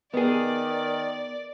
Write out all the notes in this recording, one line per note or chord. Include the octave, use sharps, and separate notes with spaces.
D#3 B3 G#4 D5